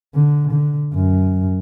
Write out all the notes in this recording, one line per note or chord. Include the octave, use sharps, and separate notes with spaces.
D3
D3
F#2